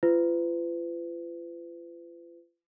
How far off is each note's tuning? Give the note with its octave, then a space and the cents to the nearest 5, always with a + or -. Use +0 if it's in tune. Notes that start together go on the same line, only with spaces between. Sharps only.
F4 -35 B4 +40